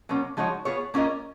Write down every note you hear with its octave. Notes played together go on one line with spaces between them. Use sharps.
B2 F#3 A#3 C#4
F3 G#3 D#4 F#4 C#5
B3 F4 G#4 C#5
A#3 C#4 F4 A#4 D#5